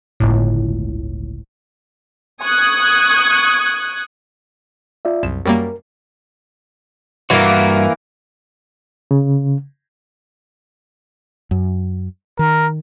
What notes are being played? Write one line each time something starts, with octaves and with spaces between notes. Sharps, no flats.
G1 C#2 A2
C#6 D#6 F#6 G#6
F4 D5 E5
C2 F#2 E7
F#2 G3 A#3 A#4
G2 E3 A#3 F#4
C#3
F#2
D#3 A#4